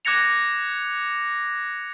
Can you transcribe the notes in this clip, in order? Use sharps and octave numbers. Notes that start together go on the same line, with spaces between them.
D6 F#6 G#6 A#6 C#7 F7